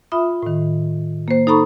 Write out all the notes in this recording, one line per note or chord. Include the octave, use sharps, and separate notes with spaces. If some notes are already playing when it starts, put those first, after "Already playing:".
F4 E5 B5 D#6
A2 D#3
A#3 C5
D#4 A4 A#5 B5 C#6